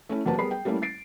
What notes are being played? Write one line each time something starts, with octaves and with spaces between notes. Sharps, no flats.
A3 C#4 E4
F1 E2 F#3 A#3 B4 A5
G3 B3 G#4 A#4 B5 C7
G5
G3 A3 A#3 C#4 E4
A6 C7 D7